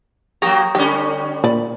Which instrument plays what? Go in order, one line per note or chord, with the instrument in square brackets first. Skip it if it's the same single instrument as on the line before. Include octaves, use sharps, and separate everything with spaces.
[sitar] F#3 A#3 G4 [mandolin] G5 A#5 [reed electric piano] C#6 D#6
[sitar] D3 G3 C#4 [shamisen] G4
[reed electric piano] A#2 [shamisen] D5 B5